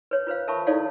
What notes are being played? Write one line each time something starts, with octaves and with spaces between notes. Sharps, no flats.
B4 C#5
F4 B4 C5 F5
A#4 E5 A5 B5 C#6
D#4 E4 A4 C#5 D5 F5